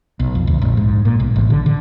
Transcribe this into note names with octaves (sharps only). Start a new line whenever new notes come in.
B1
F2
D2
A#1
G#2
A#2
B1
A1
D3
D3